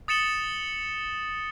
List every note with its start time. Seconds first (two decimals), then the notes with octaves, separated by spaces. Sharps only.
0.08 D#6 A6 C#7 E7 F#7 G7